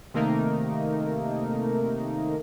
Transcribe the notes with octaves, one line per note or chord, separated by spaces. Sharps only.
C3 D#3 A3 A#3 D#4 A#4